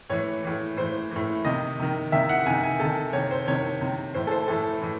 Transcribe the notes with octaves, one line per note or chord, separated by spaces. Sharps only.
A2 E3 C#5
A2 E3
A2 E3 C5
A2 E3
C3 D#3 D#5
C3 D#3
C3 D#3 E5
F#5
C3 D#3 G#5
G#5
C3 D#3 A4
C3 D#3 C#5
C5
C3 D#3 C#5
C3 D#3
A2 E3 C5
A4
C5
A2 E3 A4
A2 E3